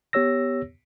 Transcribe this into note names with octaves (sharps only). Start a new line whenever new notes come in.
B3 G4 C#5 E6 A#6